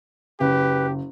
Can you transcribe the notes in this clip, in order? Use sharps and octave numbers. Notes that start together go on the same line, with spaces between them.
F#1 G4 B4